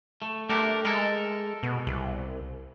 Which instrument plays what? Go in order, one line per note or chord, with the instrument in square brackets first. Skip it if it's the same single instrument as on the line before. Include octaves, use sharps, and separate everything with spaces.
[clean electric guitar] A3
[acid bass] A3 [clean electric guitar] D4 G4 A#4
[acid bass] G#3 [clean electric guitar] A4 A#4
[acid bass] B2
C2